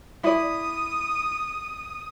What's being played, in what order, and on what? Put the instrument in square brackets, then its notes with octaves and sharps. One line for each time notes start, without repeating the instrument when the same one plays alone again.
[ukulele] E4 D5 [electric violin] D#6